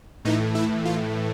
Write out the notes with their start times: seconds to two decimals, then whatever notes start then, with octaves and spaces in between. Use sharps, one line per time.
0.25 A2 E3 A3 D#4
0.55 E4
0.85 F4